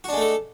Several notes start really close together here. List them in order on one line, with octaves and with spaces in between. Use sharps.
F#4 D4 G#3 A3 A4